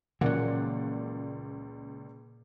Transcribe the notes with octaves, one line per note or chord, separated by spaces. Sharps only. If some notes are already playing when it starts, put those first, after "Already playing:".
C#2 A#2 E3 F#3 A#3 D5 F#5